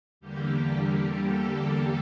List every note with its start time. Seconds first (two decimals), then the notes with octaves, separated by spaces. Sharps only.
0.21 E2 D3 G3 A#3 G4
1.23 A4